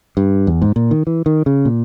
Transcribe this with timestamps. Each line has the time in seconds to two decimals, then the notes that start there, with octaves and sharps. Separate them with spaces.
0.17 G2
0.47 E2
0.62 G#2
0.76 A#2
0.91 D#3
1.07 E3
1.26 D#3
1.46 C#3
1.65 A#2